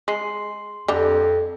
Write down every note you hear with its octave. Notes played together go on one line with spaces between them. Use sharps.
G#3 C6 C7
F2 D3 G3